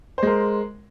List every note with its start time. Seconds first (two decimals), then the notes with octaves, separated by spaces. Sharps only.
0.18 C5
0.23 G#3
0.27 A#4